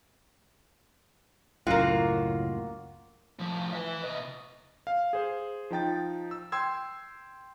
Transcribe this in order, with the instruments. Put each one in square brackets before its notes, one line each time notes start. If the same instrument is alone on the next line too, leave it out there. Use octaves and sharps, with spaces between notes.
[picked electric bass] C#2 F#2 A2 [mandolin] A#3 F#4 [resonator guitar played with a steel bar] F4
[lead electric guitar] A2 F3
B4 E5
C3 D#5
[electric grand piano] F5
G#4 C5
F3 D#4 G5 A6
E6
G5 C6 E6 G#6